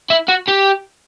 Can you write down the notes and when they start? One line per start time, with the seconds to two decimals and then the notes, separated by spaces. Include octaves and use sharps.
0.10 E4
0.28 F#4
0.48 G4